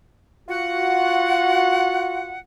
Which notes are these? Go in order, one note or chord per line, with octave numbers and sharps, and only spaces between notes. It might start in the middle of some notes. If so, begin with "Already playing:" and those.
F4 F#4 F#5